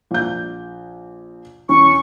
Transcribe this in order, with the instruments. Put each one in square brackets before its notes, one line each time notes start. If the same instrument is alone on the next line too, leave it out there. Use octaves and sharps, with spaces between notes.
[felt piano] A#1 G6
[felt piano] E2 C#4 [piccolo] C#6